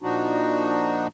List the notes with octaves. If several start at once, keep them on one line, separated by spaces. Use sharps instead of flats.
A#2 F3 D4 D#4 F#4